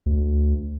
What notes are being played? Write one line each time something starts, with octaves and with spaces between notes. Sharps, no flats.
D2